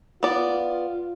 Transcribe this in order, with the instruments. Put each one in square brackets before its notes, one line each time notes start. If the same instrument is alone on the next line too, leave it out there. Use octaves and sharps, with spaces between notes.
[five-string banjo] B3 D5 [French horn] F4